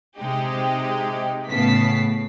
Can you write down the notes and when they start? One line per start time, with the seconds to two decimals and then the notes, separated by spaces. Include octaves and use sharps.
0.18 C3 G#3 D#4 G4
1.47 A2 C#3 B3 A5 B6 C7